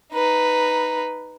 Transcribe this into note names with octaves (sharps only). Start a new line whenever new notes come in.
D#4 B4